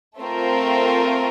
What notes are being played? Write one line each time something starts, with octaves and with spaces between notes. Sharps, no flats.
A3 C4 F4 A#4